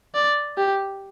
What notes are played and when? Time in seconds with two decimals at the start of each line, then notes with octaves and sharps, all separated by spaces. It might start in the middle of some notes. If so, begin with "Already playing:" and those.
0.14 D5
0.57 G4